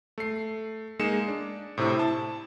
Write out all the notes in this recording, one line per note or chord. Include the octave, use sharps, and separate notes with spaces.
A3 C7
G#3 A#3 D#4 C#7 E7
D4
A2 C3 C4 E4
A5